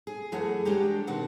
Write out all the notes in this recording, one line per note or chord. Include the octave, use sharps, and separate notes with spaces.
G#4
F#2 E3 A3 G#4 F#5
G#3 D4 F#4 G4 A#4
B2 D#3 C4 F#5